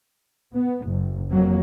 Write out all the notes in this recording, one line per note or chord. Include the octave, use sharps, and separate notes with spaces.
B3
F#1
F2 F#3 A#3